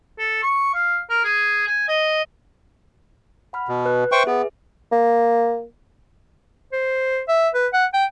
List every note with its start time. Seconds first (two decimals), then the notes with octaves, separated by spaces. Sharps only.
0.19 A4
0.43 C#6
0.74 F5
1.10 A#4
1.24 G#4
1.67 G#5
1.88 D#5
3.53 F#5 B5 F6
3.68 B2
3.86 B4 F#6
4.12 C5 E5 G5 C#6
4.27 B3 G#4 B4
4.92 A#3
6.72 C5
7.28 E5
7.54 B4
7.73 F#5
7.94 G5